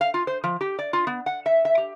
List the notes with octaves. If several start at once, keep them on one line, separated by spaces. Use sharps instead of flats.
F5
F4
C5
F3
G4
D5
F4
B3
F#5
E5
E5
G4